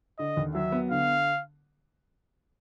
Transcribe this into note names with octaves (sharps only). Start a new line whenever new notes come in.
D3 D#5
D#2
F#3 E5
B3
D3 F5